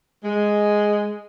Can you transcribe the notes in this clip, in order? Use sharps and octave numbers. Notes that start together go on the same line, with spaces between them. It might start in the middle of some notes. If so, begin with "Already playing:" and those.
G#3